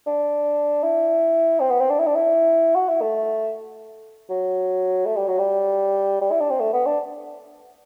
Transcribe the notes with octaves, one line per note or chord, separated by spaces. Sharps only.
D4
E4
C4
B3
C4
D4
E4
D4
E4
F#4
E4
A3
F#3
A3
G3
F#3
G3
G3
E4
D4
C4
A3
B3
D4